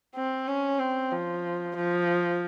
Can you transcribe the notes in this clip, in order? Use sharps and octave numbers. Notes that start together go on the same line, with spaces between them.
C4
C#4
C4
F3
F3